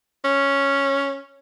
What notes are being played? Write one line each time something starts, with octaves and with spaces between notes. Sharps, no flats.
C#4